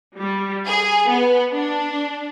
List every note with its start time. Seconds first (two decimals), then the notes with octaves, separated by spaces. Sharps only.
0.18 G3
0.66 G#4
1.09 B3
1.52 D4